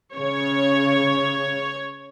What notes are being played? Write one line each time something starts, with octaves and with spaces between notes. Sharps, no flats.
C#3 C#5